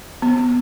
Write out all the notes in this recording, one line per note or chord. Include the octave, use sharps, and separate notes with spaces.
B3